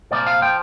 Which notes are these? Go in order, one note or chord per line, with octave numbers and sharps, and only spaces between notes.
C2 A#2 F3 D5
F5
A#2 F3 G5